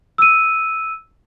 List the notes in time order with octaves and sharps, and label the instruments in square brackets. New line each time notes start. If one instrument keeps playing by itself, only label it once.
[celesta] E6 D#7